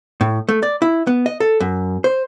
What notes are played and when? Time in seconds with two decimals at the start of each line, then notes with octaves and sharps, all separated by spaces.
0.21 A2
0.49 A3
0.63 D5
0.82 E4
1.07 B3
1.26 D#5
1.40 A4
1.60 F#2
2.04 C5